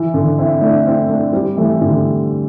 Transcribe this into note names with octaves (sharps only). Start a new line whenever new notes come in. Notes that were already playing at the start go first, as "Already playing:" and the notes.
Already playing: E3
D3
C4 E4
A3 D4
C4 E4
A3 D4
G3 C4
E3 A3
D3 G3